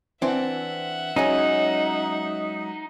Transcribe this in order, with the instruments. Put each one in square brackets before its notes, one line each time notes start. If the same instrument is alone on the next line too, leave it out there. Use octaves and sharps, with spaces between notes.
[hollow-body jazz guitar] E3 C4 D4 [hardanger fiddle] E5 F#5
[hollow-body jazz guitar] F#3 G#3 C#4 [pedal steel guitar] D#4